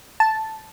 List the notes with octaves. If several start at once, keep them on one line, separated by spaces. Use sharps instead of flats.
A5